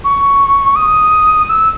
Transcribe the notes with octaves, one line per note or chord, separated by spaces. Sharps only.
C#6
D#6
E6